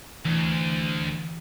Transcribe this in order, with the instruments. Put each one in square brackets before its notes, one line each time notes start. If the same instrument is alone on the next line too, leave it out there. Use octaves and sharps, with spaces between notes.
[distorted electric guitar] D2 [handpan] E3